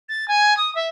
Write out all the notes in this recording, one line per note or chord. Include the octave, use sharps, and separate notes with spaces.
A6
G#5
D#6
E5